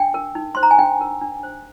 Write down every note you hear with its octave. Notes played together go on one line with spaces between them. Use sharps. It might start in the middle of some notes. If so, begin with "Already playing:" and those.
Already playing: D4 G5
A#4
D#4
C5 C6
A#5
G#5
D4 G5
A#4
D4
C5